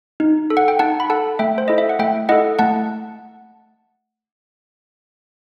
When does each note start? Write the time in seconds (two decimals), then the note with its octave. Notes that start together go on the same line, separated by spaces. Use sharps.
0.20 D#4
0.50 A4
0.57 F#5
0.68 G5
0.79 D#4 F#5 A5
1.00 B5
1.10 A4 F#5 A5
1.39 A3 E5 G5
1.58 C5
1.68 E4 A4 D#5
1.78 E5
1.89 F#5
1.99 A3 E5 G5
2.29 E4 A4 D#5 F#5
2.59 A3 F#5 A5